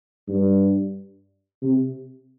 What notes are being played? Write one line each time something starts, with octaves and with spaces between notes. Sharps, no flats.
G2
C3